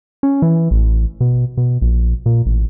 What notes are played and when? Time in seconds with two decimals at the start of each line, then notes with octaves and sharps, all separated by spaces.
0.23 C#4
0.42 E3
0.71 A1
1.21 B2
1.57 B2
1.81 A#1
2.26 A#2
2.46 A1